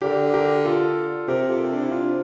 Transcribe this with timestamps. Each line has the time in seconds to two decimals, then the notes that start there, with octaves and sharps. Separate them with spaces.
0.02 D3 G4 A#4
0.34 G4 A#4
0.65 F4 A4
1.28 C3 G4 A#4
1.49 F4 A4
1.64 C4
1.73 D4
1.82 E4
1.91 D4 F4